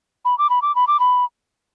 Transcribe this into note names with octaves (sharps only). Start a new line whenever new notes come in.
B5
D6
B5
D6
B5
D6
B5